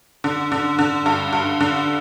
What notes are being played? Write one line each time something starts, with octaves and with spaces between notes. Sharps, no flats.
D3
D3
D3
G2
G2
D3